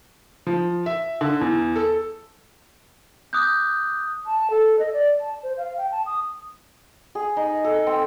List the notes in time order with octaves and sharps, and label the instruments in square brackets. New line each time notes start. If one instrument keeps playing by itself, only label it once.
[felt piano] F3
E5
D3
E2
A4
[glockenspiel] D6 D#6 F#6 G6
[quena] A5
A4
D#5
D5
A5
C5
F5
G5
A5
D#6
[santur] G#4
D#4
A4
C4